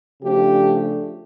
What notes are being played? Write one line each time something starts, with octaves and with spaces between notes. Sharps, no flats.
C#3 F3 A3 D4 G4